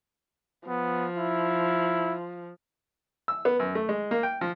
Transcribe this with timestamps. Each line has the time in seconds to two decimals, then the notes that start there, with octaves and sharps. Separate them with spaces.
0.68 F3 B3
1.18 E4
3.28 E6
3.45 B3
3.59 F#2
3.75 A3
3.89 G#3
4.11 A#3
4.23 G5
4.41 F3